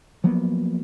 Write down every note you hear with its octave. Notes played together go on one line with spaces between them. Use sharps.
F3 F#3 A#3 B3